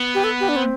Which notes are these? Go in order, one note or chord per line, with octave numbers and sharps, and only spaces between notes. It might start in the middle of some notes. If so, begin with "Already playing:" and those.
Already playing: B3
G4
A4
G4
D4
C4